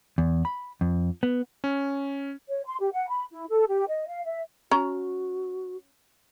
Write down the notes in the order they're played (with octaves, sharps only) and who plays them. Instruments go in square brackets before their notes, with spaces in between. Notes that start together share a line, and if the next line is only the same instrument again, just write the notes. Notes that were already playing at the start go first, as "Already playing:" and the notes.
[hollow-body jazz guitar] E2
B5
F2
B3
[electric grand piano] C#4
[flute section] C#5
C6
G4
F#5
B5
E4
A4
G4
D#5
F5
E5
[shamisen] C#4 A#5 [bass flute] F#4